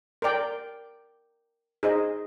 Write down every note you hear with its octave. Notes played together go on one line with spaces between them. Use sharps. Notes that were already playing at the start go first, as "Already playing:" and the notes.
A#4 D5 G5
D#4 G#4 C5 D#5